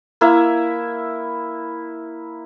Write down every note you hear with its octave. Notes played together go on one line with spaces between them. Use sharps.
A#3 E4 E5